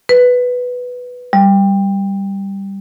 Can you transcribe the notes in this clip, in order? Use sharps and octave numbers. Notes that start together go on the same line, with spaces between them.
B4
G3